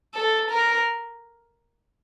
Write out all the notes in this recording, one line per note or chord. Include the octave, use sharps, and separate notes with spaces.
A4
A#4